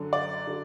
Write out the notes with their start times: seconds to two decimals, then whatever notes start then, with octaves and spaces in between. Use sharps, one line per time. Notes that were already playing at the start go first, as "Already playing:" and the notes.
Already playing: F#2 D3 F#3
0.13 D5
0.47 D3 F#3